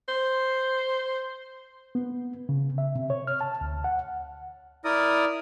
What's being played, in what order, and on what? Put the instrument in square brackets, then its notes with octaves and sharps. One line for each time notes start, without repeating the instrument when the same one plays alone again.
[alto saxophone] C5
[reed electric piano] B3
C#3
E5
C3
C#5
F6
A5
D2
F#5
[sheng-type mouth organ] E4 D5 D#6 [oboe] A#4